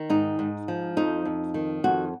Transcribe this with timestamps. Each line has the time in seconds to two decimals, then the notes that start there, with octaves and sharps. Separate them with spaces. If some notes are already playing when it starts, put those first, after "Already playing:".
Already playing: D#3
0.10 G#2 D#4
0.39 G#2
0.68 F3
0.97 F2 D#4
1.25 F2
1.54 D#3
1.84 F2 F#4